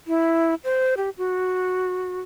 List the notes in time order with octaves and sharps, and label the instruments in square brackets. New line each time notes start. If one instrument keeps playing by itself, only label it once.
[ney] E4
C5
G4
F#4